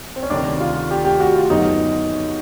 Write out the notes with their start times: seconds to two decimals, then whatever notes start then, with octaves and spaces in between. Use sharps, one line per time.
0.16 C4
0.23 C#4
0.30 D2 C3 D#3 D4
0.60 F4
0.91 G4
1.05 G4
1.20 F#4
1.36 F4
1.50 F#2 D3 F#3 B3 D#4